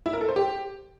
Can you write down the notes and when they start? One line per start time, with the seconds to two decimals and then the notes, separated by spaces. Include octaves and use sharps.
0.06 E4
0.13 A#4
0.21 A4
0.29 C5
0.36 G4